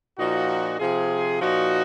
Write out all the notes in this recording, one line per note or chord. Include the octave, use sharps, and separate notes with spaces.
A#2 F3 D#4 F#4
C3 F3 F4 G#4
A#2 F3 D#4 F#4